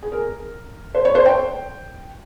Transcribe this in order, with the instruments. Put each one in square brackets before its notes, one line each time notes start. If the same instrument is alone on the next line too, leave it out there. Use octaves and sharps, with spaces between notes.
[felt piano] G#4
A#4
C5
C#5
C5
G5